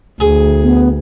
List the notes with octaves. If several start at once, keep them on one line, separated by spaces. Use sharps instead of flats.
D2 G#4
B3